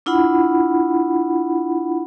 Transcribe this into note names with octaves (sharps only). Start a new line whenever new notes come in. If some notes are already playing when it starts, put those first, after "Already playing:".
D4 E4 F4 F#5 B5